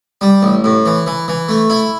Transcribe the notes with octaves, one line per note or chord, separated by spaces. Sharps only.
G3
A1
A2
E3
E3
E3
A3
E4